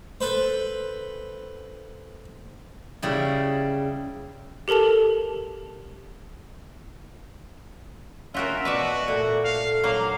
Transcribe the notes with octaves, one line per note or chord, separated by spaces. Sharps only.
A4 B4 C5
C#3 G3 E4
G4 A4 A#4 A5 F7
C#4 F4 F#4 A#4 E5
B2 F#4 B4 D5 E5
A#2 A3
A4 F5
F#3 A#3 F5